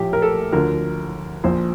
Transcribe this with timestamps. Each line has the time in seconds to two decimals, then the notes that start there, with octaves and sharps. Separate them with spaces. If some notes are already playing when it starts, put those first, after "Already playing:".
Already playing: A#1 A2 F3 G4
0.13 A#4
0.22 A4
0.52 D2 D3 F3 A#4
1.44 A#1 A#2 F3 C5